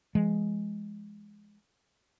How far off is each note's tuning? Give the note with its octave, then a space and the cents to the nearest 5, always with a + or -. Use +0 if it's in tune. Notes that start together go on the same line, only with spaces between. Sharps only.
F3 -45 G#3 +0